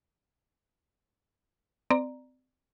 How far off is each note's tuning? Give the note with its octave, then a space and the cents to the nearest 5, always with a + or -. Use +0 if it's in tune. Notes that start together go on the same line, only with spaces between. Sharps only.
C4 -30 D5 +15 A#5 +0